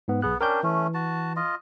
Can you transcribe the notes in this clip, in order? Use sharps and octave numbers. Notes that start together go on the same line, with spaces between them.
G#2 B3
B1 B3 G#4 F#6
C#4 D4 A#4 G5 G6
E3 A3 C#4
F#4 A5
F4 D#5